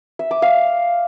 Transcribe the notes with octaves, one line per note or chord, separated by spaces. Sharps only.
E5
D6
F5